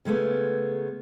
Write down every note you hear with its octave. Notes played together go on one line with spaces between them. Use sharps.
C#3 G#3 A3 B3